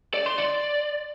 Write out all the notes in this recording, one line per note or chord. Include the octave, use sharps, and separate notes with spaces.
D5
C6
D5